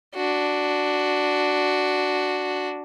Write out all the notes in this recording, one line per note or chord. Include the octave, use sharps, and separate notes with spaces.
D4 F#4